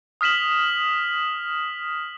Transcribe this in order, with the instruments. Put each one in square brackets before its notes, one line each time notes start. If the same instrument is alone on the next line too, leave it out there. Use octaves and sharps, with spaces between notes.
[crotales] D#6 F6 B6 E7 F#7